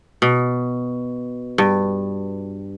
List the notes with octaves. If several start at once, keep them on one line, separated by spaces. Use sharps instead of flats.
B2
G2